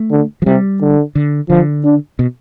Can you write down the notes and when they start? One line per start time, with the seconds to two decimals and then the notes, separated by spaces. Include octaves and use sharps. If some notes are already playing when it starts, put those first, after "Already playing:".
Already playing: A3
0.11 D3
0.42 F3
0.46 C3 G3
0.81 D3
1.15 D3
1.50 D3 F3
1.84 D4
2.19 B2